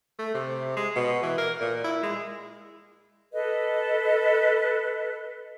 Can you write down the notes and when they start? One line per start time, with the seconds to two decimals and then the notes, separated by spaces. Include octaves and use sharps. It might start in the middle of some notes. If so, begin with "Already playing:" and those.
0.19 A3
0.34 C3
0.77 G#3
0.96 B2
1.23 E3
1.38 A#4
1.61 A#2
1.84 E4
2.03 G#3
3.33 A4 B4 D#5